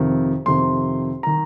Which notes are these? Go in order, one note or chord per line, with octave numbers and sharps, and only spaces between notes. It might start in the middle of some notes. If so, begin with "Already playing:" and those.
Already playing: F2 C3 D#3
F2 C3 D#3 C6
D#3 A#5